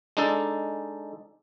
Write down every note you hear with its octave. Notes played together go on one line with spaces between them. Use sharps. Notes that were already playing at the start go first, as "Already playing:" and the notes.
G#3 D4 D#4 A4